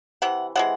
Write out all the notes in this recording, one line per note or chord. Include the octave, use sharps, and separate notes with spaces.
C3 E3 F#5
C3 E3 G#3 F#5